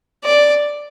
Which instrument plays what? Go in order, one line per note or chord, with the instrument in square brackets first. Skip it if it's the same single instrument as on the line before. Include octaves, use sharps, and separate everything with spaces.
[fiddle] D5